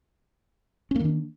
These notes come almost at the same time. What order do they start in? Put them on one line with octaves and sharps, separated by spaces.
C#4 A#3 D#3 D4